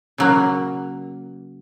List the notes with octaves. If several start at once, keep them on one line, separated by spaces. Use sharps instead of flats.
C#3 F#3 A#3